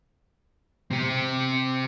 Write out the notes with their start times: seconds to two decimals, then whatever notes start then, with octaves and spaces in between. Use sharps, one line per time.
0.91 C3 G4